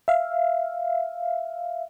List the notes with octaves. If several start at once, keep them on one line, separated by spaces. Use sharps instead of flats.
E5 F5